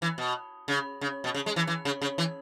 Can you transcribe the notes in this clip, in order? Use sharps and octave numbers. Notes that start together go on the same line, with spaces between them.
E3
B2
C#3
C#3
B2
C#3
G#3
E3
E3
C#3
C#3
E3